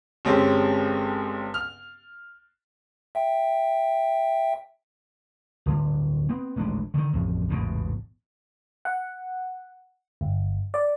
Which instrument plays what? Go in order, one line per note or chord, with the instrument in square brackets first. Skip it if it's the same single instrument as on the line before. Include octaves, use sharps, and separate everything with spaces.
[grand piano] G1 G#3 C4 C#4 G4
F6
[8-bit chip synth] E5 G5
[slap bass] D1 D3 G3
B3 C4
D#1 A1 G#3 D4
D3 D#3
A1 F2
A1 E2 G#2 B2
[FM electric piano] F#5
G1
D5